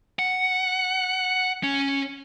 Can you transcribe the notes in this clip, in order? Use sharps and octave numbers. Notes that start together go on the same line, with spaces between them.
F#5
C#4